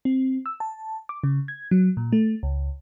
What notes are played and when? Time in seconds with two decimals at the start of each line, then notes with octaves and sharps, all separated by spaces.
0.05 C4
0.46 E6
0.60 A5
1.09 D6
1.24 C#3
1.48 G#6
1.71 F#3
1.97 A#2
2.13 A3
2.43 C#2